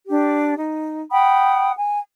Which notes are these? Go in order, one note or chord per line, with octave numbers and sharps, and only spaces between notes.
D4 G4
D#4
F#5 G5 B5 D#6
G#5